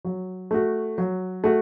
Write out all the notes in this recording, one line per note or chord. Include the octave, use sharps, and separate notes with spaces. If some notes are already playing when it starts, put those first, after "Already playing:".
F#3
A3 F#4
F#3
A3 F#4